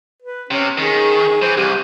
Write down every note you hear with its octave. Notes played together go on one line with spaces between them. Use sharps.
B4
C3 C#4
D#3 G#4
E3 C5
C2 G4